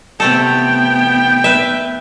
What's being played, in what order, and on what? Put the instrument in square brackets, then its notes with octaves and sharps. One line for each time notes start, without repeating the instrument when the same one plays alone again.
[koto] C3 A3 A4 [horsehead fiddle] B3 G5
[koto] B4 E5